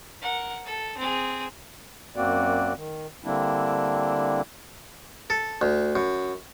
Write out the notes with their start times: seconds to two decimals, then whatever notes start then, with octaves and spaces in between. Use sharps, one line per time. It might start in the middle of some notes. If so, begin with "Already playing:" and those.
0.21 A#4 F#5
0.66 A4
0.97 C4 G#4
2.16 F#2 A#3 C4 F#4 D5
2.76 D#3
3.24 D3 G3 A#3 C4 D4 E4
5.30 A4
5.61 D2
5.96 F#2